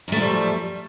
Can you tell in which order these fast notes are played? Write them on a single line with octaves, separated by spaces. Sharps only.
F#2 A3 F3 G3